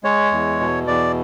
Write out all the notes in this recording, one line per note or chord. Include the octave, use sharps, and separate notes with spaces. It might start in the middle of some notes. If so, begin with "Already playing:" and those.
G#3 C#5
E2
B2
E2 D5